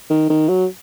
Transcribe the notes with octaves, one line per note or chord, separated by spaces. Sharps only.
D#3
D#3
F#3